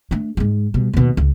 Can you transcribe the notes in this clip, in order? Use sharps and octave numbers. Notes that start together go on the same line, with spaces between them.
A3 D4
G#2 G#3
B2 G3
D#2 B2
C#2